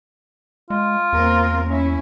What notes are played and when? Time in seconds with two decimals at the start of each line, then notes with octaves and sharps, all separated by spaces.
0.70 G#3 F4
1.13 E2 A#3 C4 A#4
1.67 C#4 E4